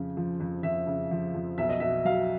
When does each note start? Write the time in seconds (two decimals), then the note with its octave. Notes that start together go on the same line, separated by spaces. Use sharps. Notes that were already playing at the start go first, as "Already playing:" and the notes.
Already playing: F2 C#3
0.17 F3
0.40 F2
0.63 F2 E5
0.87 C#3
1.11 F3
1.34 F2
1.58 B1 E5
1.69 D#5
1.80 B2 E5
2.05 F#3 F5